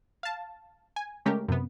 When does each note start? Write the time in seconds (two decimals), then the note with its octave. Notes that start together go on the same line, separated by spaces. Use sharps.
0.23 F5 A5
0.96 G#5
1.25 C#3 G#3 A3 C#4 G4 A#4
1.48 F#2 C3 B3